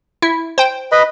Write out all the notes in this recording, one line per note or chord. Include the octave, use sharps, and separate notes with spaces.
E4
C5 G5
B4 D#5 B5